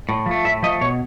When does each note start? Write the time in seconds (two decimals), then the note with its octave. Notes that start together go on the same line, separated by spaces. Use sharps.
0.09 A2
0.26 F3 A3
0.44 A2 E5
0.63 F3 A3 D#5
0.81 B2 C#5